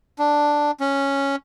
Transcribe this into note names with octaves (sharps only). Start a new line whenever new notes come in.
D4
C#4